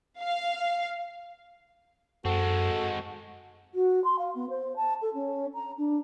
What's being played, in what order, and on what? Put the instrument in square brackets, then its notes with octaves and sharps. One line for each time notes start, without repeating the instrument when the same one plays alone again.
[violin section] F5
[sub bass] F#2 [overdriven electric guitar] G#3 C4 [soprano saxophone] F#4 [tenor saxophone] A4
[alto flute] F#4
C6
F5
B3
C5
A5
A4
C#4
A#5
D4